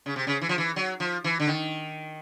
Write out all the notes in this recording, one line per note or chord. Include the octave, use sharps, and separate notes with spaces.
C#3
C3
C#3
E3
F3
E3
F#3
F3
E3
D3
D#3